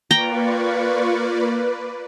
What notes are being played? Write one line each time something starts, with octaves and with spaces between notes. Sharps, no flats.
A#3 F4 B4 D5 G5 A#5 C#6
B4